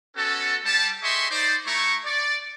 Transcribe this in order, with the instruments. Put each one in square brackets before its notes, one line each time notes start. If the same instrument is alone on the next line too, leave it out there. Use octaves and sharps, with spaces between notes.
[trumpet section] B3 C#4 F#4 A4
G3 A5
G4 G#4 D#5 E5 C6 C#6
D#4 C5 D5
A3 E4 A#5 C#6
D5